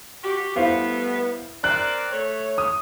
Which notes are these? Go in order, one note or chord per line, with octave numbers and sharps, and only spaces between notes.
F#4 G4
G3 A3 B3 E4 C5 F5
C4 A#4 D5 F#6
A3 C#5
D#6